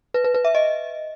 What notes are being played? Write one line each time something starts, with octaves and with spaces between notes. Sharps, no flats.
B4
B4
B4
E5
D#5